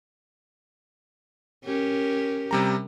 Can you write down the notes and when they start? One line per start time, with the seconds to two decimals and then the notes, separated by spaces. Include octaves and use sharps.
1.64 C#4 G4 A#4
2.51 C3 G3 A#5